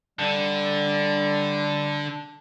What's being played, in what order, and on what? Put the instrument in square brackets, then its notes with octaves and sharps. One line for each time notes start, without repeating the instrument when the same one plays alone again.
[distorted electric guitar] D3 [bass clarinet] G3